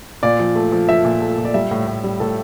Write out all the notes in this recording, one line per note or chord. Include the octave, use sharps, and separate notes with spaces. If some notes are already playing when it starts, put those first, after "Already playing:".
A#2 D5
F3
A3
F3
F3 E5
A#2
A3
A#2
D5
G3 E5
A2
A2
G3
A2 A4